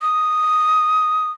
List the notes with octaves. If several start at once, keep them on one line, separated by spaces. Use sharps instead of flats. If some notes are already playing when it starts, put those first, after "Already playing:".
D#6